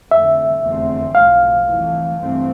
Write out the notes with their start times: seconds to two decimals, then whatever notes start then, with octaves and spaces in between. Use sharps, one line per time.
0.11 F2 D3 A3 E5
0.63 F1 E2 D3 A3 C4
1.15 B1 A2 F3 A3 F5
1.66 F2 E3 A3
2.18 G2 E3 A3 C4